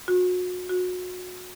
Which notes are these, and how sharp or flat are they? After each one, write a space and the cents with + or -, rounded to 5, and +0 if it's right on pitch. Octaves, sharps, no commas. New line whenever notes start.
F#4 -35
F#4 -30